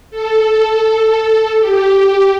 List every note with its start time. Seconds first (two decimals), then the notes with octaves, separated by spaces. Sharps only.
0.11 A4
1.59 G4